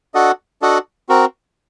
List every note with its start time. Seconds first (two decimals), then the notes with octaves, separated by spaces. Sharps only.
0.14 D4 F#4 A4 D#5 F#5
0.62 D4 F#4 A4 D#5 F#5
1.09 C4 F#4 A#4